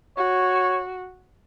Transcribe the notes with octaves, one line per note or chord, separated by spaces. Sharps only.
F#4 C#5